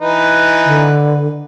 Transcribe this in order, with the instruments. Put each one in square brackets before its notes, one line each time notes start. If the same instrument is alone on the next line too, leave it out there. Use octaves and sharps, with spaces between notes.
[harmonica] E3 D#4 B4
[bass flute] D3